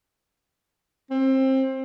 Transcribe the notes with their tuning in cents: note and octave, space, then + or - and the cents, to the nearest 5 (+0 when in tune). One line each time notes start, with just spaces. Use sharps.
C4 +25